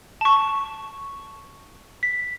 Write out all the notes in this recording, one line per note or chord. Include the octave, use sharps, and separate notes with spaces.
A5 C#6
B6